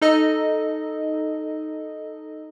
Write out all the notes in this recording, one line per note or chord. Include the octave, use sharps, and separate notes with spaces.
D#4 A4 D#5